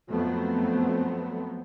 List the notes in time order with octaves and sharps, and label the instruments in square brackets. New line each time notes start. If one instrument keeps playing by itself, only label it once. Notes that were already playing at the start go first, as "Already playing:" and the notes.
[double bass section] F2 F#3 A3 B3 C4